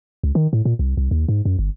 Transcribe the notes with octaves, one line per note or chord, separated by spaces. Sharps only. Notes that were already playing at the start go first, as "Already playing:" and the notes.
C#2
D#3
A2
A#2
C2
C2
D#2
G#2
F#2
G1